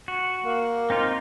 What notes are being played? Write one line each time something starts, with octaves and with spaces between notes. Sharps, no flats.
F#4
A#3
C4 D#4 F4